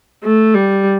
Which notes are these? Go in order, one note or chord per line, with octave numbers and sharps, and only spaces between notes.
A3
G3